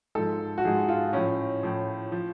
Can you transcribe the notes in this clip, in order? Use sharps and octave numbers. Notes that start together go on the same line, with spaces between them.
G#2 F3 A4
F#4
G#2 F3 G#4
F4
A2 F3 C#4
A2 F3
F3